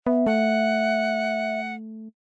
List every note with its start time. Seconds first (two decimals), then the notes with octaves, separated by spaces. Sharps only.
0.07 B3 E5
0.27 A3 F#5